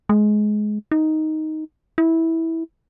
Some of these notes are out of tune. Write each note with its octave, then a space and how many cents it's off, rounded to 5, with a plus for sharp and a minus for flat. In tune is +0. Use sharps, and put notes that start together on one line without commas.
G#3 +20
D#4 +5
E4 -15